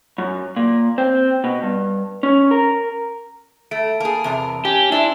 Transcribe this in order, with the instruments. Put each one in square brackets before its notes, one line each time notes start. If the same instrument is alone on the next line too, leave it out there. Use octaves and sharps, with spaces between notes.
[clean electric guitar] F#2
A#2
C4
B2
G2
C#4
A#4
[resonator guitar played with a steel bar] A3 [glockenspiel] D7
[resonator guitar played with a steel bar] A#3 G#4 [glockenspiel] A5 D7
[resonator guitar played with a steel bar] E2 C3 A#4
[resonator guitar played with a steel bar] C#4 [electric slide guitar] G4 [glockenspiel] G#5
[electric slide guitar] D4 [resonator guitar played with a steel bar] E4 C5